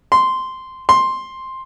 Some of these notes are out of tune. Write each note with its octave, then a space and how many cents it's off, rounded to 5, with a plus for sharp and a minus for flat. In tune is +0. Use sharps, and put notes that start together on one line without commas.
C6 -10
C6 +5